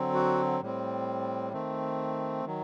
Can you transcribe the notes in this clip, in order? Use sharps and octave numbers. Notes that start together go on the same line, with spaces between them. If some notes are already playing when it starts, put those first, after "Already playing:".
Already playing: D3 F#3 C4
F#4
A2 G3 C4
D#3 A3 C4
D#3 F#3